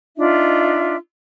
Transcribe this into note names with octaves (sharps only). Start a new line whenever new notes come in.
D4 D#4 F4 E5